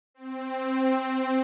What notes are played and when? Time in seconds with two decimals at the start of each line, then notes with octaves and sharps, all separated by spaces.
0.14 C4